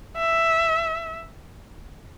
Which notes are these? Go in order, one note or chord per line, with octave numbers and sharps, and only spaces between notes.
E5